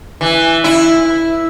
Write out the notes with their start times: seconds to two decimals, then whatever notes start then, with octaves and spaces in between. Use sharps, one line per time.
0.21 E3
0.64 E4